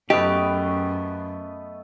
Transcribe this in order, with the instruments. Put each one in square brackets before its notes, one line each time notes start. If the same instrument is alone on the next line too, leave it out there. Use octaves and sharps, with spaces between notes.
[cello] F#2 [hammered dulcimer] A3 B3 B4 [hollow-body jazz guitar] G4 [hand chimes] D#5